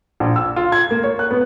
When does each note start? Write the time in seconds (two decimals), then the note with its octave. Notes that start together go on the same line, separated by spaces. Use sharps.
0.20 A#1
0.36 E6
0.56 F4
0.72 G#6
0.91 A#3
1.03 C#5
1.19 F#6
1.31 B3